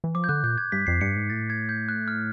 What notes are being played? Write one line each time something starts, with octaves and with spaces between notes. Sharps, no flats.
E3
F3 D6
G6
D3 F#6
A#2 G6
G#6
G2 B6
F2 C7
G2 C#7
G#2
A2 A6
G#6
G6
F#6
F6